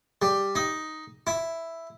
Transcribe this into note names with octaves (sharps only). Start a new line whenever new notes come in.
G3
D#4
E4